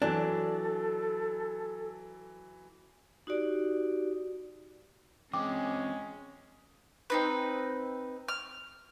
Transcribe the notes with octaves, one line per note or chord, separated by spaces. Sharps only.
E3 F#3 D4 A4
D#4 F#4 G4 D5
E3 G#3 C4 C#4 C5 G5 D6
C4 D#4 B4
F6